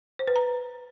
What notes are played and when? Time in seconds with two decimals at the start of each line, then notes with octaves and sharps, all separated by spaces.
0.19 C5
0.28 B4
0.36 A#5